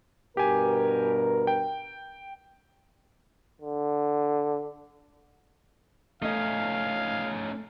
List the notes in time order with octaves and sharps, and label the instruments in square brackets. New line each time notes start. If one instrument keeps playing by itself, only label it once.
[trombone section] G2 B2 A#4 [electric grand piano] G4 G#5
[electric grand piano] G5
[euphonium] D3
[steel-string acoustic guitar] A3 D#5 [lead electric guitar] C#4 D#4 [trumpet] F5